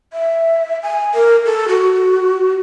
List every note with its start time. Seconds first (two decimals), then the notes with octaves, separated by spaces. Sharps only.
0.13 E5
0.83 G#5
1.14 A#4
1.46 A4
1.68 F#4